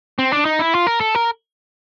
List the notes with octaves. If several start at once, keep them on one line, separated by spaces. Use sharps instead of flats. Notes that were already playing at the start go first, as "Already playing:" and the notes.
C4
D4
D#4
E4
F4
A#4
A4
A#4